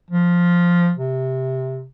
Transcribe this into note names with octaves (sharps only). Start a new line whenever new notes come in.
F3
C3